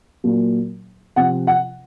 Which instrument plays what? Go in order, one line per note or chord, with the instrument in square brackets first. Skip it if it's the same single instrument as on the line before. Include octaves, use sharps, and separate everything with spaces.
[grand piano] A#2 F#3 A#3
C3 F3 C4 F#5
F#5